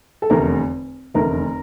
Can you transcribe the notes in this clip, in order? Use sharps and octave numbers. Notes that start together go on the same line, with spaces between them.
A4
F1 E2 D3 A3 A#4
F1 E2 D3 A3 A#4